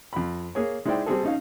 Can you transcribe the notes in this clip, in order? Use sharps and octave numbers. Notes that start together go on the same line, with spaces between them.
F2 B5
A#3 G#4 C#5
G#3 D#4 E4 C5 D5 G5
G3 C4 G#4 A4
C#4 D#4 F5